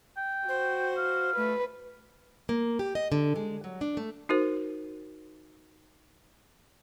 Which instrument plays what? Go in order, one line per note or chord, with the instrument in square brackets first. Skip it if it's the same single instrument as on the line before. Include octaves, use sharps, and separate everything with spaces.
[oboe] G5
[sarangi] F#4 [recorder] C5
[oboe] F5
[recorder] A3 [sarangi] B4
[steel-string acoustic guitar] A#3
G4
D#5
D3
G#3
F#3
D4
A3
[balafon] D#4 F#4 A#4 C5